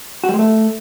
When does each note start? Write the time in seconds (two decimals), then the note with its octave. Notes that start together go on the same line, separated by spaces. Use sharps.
0.24 F#4
0.29 G3
0.34 G#3
0.39 A3